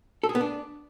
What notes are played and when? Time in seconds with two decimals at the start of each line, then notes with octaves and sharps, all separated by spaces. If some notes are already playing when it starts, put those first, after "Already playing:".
0.24 A4
0.29 G#4
0.35 B3
0.41 D4